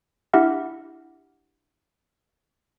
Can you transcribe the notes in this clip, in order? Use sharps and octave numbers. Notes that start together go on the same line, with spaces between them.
D4 E4 G4 E5 F#5 F6